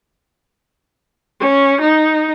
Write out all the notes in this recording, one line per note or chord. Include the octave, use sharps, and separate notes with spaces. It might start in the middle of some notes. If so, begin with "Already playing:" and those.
C#4
D#4